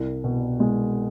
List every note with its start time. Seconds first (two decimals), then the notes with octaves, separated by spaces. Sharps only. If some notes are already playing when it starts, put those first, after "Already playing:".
Already playing: C2
0.24 B2
0.60 G#3